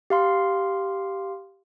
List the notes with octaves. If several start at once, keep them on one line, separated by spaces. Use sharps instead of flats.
G4 F5 C6